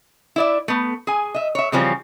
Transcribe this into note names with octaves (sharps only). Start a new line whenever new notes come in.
E4 D5 E5
A3 B3
G#4 G#5
D#5 E5
C#5 E5
C#3 E3 F3 G3 C4 C#4